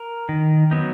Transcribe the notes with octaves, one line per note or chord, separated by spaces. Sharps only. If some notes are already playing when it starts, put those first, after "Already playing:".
Already playing: A#4
D#3
F#3 B3 D#4